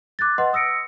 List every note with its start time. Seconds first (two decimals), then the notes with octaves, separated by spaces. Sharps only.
0.19 D6 F#6 G#6 A6
0.38 B4 D#5 F#5 C6
0.53 D#6 E6 A#6 C#7 D7